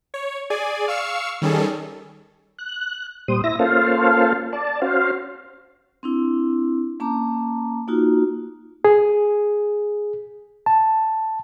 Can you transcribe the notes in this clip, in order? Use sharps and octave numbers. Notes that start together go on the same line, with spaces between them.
C#5
G#4 D5 G#5
F5 C#6 E6 C#7
D#3 G3 C#4 G#4 A4
F#6
A#2 G3 C5 D#6
E4 E5 A#6
A#3 C#4 F4 A4 C5 F5
D5 A5
C#4 F#4 C5 F5
C4 D4 E4
A#3 C#4 A5 A#5 D6
A#3 D#4 F4 F#4
G#4
A5